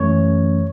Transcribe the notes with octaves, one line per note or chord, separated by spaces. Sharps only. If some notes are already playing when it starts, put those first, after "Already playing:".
Already playing: F#2 E3 A3 C#4 C#5